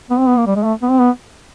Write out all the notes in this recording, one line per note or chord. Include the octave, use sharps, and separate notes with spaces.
B3
C4
B3
A#3
G3
G#3
A3
B3
C4
B3